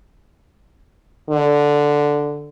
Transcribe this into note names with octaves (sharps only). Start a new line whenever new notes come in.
D3